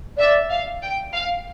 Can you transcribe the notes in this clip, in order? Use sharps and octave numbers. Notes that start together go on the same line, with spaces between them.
D5 E5
F5
G5
F5